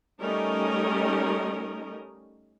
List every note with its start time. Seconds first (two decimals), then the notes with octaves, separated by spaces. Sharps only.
0.20 G3 A3 C#4 D#4 A#4 D#5